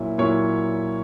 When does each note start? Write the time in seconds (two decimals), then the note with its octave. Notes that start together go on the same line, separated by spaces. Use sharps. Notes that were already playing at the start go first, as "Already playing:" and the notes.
Already playing: A#2 F#3 C#4 E4 E5
0.18 A#2 F#3 C#4 E4 C#5 C#6